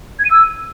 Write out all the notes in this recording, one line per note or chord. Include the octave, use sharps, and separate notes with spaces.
G#6
D#7
E6